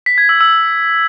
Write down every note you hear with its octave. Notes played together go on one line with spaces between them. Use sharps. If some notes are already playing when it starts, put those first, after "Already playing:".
B6
G#6
E6
E6